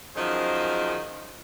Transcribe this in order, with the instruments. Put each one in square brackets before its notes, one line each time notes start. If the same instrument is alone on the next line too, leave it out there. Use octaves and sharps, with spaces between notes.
[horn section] F#2 D#3 F3 D#4 G#4 C5